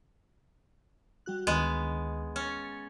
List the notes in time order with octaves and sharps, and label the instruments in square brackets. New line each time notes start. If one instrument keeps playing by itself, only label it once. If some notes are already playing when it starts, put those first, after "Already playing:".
[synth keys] G3 F#4 F#6
[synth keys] D2 D#3 [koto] G#3 B3
[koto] C#4 [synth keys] A6 C#7